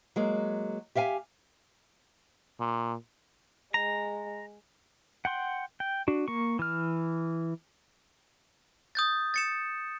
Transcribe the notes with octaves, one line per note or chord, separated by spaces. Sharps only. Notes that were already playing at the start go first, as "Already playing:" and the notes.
F#3 G#3 A#3
G4 E5 F5 G5 G#5
A#2
G#3 A#5
F#5 G5 C6
G5
D4 F#4
A#3 C#6
E3 F6
D#6 G6 A6
A6 C#7 E7